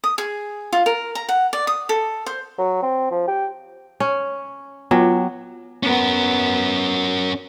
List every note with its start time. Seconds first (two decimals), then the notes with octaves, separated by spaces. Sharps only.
0.04 D#6
0.18 G#4
0.73 F4
0.86 A#4
1.15 A#5
1.29 F#5
1.53 D5
1.67 D#6
1.89 A4
2.26 C5
2.58 F#3
2.82 C4
3.11 F3
3.28 G4
4.00 C#4
4.91 F#3 B3 F4 G5
5.83 B3 C#4 A#4